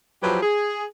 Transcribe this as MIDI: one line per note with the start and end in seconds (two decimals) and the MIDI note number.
0.23 0.39 53
0.23 0.39 54
0.23 0.39 64
0.23 0.39 67
0.23 0.39 71
0.23 0.39 72
0.43 0.84 68